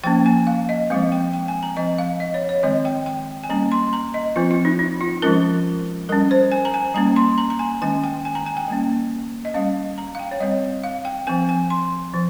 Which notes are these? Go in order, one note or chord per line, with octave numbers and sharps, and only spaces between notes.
F3 A#3 C#4 G5
G#5
F5
D#5
F3 G#3 C4 F5
G5
G5
G#5
A#5
F3 C4 D#5
F5
D#5
C#5
C#5
D#3 G#3 C4 D#5
G5
G5
G#5
G3 A#3 C#4 A#5
C6
A#5
D#5
F3 C4 F4
F4
D#4
D#4
F4
F3 G#3 C#4 A#4
G3 C#4 A#4
C5
G#5
A#5
G#5
G3 A#3 C#4 A#5
C6
A#5
A#5
G#5
D#3 G#3 C#4 G#5
G5
G#5
A#5
G#5
G5
G3 A#3 C#4
D#5
G3 C#4 F5
A#5
F5
G5
C#5
G3 C4 D#5
F5
G5
F3 C4 G#5
G#5
C6
F3